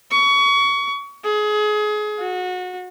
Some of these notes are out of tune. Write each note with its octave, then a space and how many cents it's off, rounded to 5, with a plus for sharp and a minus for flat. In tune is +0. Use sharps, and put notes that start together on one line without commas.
C#6 +25
G#4 +25
F#4 -25